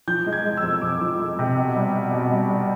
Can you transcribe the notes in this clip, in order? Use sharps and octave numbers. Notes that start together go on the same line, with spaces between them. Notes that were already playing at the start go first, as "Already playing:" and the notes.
F3 G6
G#3
G#6
G#3
E6
F2
F2 D6
F3
G#3
C3
B2
G3
B2
B2
G3
G3